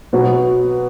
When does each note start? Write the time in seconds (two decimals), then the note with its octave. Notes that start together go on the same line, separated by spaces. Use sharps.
0.13 B2 F#3 B3 F#4